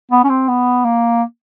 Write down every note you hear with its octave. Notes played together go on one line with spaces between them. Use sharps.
B3
C#4
C4
B3
A#3